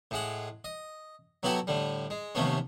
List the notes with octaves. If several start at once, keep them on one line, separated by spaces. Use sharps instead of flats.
A2 G#3 F#5
D#5
F#3 B3 E4 F#4 G4 A4
A2 D3 G3
G#3
D#2 C3 F3 A3 B3 C#4